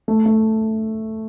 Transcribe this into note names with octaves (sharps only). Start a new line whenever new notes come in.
A3
A3